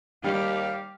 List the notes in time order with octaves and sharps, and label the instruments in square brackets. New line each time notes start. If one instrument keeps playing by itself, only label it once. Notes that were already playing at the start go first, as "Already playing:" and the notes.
[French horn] D#2 [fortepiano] G3 [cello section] G4 [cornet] F5